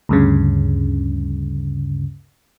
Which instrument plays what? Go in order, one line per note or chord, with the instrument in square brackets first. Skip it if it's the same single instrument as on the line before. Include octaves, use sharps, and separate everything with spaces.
[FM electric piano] D2 G2 C#3